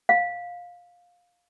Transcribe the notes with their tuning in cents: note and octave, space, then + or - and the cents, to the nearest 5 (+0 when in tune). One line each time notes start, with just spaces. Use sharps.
F5 +15